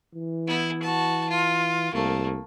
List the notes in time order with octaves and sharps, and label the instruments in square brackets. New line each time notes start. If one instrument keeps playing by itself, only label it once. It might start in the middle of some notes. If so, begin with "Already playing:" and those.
[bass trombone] E3
[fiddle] B3 E4
F#4 A5
F4
[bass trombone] C2 [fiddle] A3 A#3